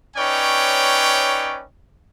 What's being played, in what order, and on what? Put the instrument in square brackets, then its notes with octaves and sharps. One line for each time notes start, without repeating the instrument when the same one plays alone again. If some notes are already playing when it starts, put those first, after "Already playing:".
[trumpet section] C#4 D#4 B4 C#5 D5 G5